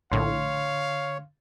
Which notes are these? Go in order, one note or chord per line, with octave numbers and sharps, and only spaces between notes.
A#1 A2 D3 C#5 F5 C6